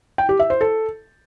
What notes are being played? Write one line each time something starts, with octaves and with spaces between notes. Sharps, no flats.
G5
G4
E5
C5
A4